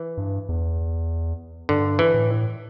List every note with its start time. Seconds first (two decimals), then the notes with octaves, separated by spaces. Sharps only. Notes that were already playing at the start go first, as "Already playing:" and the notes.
Already playing: E3
0.17 G2
0.49 E2
1.69 G2 D3
1.99 E3
2.14 A2